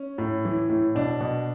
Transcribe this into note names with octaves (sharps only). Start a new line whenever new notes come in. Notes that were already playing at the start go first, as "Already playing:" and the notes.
Already playing: C#4
A2
E3
A2
B2 D4
B2